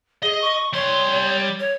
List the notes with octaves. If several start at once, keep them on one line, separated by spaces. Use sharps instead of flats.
G#4 D#5
C#6
G3 C#5 C6
C#5